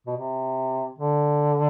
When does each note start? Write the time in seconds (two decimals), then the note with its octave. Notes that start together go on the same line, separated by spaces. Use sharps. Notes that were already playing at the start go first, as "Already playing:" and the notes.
0.07 B2
0.17 C3
0.99 D3